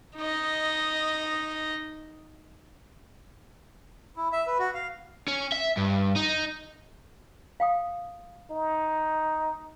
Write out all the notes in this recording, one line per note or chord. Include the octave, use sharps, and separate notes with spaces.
D#4 D#5
E4
E5
B4
F#4
F5
C#4
E5
G2
D#4
F5 G5 D#6
D#4